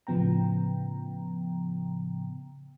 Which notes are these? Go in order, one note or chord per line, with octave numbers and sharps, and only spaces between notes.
A2 C#3 F3 B3 G5 A#5